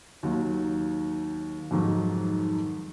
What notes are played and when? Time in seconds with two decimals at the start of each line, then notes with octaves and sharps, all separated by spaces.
0.23 D#2 D#3 F#3
1.71 F2 G#2 D#3 F#3